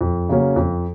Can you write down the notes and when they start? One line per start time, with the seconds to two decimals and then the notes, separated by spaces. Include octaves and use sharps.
0.01 F2
0.29 C#3 F#3 A#3 C#4
0.56 F2